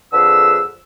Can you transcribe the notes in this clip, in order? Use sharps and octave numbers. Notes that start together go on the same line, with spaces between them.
F2 D3 G#4 B4 E6